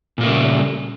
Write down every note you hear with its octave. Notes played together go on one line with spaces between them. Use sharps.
A#2 C#3 G3 A3 A#3